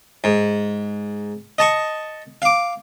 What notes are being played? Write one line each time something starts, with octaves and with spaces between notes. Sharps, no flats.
G#2
D#5 A5 C#6
F5 D6